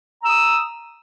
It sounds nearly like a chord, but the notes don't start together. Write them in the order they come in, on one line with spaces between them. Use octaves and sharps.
A#5 E6 D#6